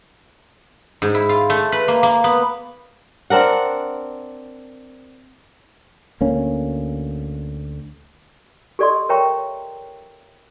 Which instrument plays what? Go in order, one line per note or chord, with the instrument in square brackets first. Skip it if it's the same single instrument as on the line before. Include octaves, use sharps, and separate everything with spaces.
[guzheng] G#2
E4
F4
A3
B4
A#3
A#3
B3
[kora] C4 D4 A#4 F#5
[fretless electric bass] D2 A#3 C#4
[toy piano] G4 A4 D5 D#5 C6
A#4 C#5 E5 G5 A#5 C#6